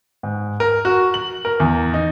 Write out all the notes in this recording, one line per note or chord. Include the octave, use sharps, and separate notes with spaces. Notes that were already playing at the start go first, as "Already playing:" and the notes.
G#2
A#4
F#4
F#7
A#4
E2
D#4